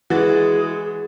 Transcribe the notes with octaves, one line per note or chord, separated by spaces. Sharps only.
E3 G#3 F#4 G#4 A6